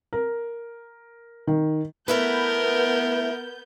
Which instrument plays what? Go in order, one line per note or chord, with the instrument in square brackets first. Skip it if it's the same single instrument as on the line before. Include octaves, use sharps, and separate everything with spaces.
[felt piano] A#4
D#3
[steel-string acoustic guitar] A3 E4 B4 [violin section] B3 G6 [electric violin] A#4